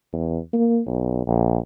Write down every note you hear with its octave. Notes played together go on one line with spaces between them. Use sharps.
E2
A#3
B1
A#1